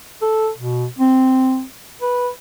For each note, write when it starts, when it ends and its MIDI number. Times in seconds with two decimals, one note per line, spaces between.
0.22 0.49 69
0.58 0.87 47
0.99 1.63 60
2.02 2.29 71